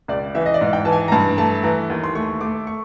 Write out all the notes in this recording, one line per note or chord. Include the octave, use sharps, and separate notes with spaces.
C#2 D5
E3 E5
D#5
D5
G#2
G5
E3 A5
G#5
A#5
G2 A5
A3 A5
E3 A#5
D#2
C6
A3 C#6
A3 D6
C#6